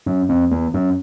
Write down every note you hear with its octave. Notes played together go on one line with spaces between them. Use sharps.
F#2
F2
E2
F#2